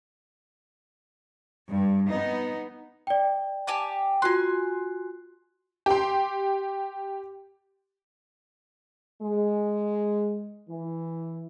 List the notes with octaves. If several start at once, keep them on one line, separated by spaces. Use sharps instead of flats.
G2
B3 D#4
D5 G5
G4 G#5 A5
F4 F#4 G#5 C6 F#6
G4 C6
G#3
E3